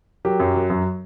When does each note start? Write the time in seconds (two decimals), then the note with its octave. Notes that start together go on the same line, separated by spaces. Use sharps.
0.25 F#3 G4 A#4
0.40 F#2
0.54 F#3
0.70 F#2